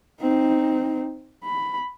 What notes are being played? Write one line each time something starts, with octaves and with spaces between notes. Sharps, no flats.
C4 D#4
B5